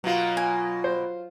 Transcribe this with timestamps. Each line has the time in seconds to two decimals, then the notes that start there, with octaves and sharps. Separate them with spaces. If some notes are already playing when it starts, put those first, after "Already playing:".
0.04 B2 F#3 A#3 F4
0.37 G#5
0.84 C5